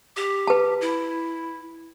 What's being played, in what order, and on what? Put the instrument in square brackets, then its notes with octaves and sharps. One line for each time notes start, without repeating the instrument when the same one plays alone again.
[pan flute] G4
[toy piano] B4 A5
[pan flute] E4